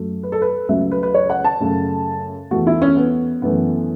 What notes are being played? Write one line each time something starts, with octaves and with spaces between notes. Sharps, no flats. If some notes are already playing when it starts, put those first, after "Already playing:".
Already playing: F#2 F#3 A3
B4
A4
B4
C#2 C#3 F#3 A3 E5
B4
B4
C#5
F#5
A5
F#2 C#3 A3
E2 E3 A3 F#4
E4
C#4
B3
F#2 E3 A3 B3